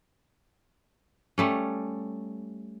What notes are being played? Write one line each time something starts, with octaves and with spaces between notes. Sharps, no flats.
G3 A3 C#4